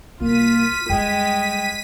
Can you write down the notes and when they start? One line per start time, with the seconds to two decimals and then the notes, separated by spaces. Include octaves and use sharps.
0.21 C2 G3 A#3 F4 B6 D#7
0.90 F2 G3 G#3 G5